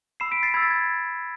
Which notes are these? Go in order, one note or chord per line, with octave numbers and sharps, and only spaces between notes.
B5 E6 C7 E7
B6 D7
A6 C7
B5 E6 G#6 B6
A6
G#6